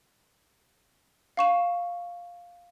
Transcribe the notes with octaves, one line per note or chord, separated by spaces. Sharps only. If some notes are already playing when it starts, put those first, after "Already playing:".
F5 C#6 E7